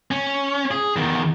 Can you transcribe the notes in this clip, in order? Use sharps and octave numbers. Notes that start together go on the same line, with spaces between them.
C#4
G#4
E2 D#3